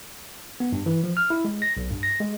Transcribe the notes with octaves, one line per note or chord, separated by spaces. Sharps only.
B3
G2
E3
F3
F6
E4
G#3
A#6
B1
G2
A#6
G#3